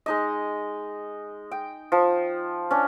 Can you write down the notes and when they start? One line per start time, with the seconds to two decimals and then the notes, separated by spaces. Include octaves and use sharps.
0.06 G#3 D#4 D#5
1.51 G5
1.92 F3
2.71 C#4 D4